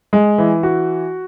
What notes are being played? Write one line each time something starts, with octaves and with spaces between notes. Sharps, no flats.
G#3
E3
F#4